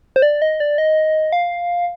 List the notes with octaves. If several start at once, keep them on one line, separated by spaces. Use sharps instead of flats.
C5
D5
D#5
D5
D#5
F5